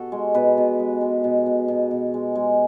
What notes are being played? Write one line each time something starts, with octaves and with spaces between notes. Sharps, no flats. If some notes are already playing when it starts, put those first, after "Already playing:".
Already playing: B2 F#4 A4
G#3
B2 B4
B2
G#3
G#3
B2
B2
B2
B2
G#3
G#3